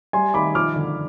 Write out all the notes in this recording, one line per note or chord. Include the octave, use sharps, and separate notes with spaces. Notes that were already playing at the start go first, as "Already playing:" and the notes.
G3 G#5 C6
D#3 B5 D6
F3 D6 F6
D3